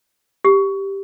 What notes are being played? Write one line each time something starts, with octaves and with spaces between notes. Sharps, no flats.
G4